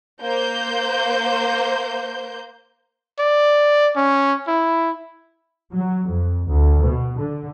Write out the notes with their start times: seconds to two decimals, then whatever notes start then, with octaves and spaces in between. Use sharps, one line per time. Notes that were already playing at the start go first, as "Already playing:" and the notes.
0.22 A#3 C5 G6
3.19 D5
3.97 C#4
4.47 E4
5.74 F#3
6.07 F2
6.48 D2
6.85 B2
7.19 D3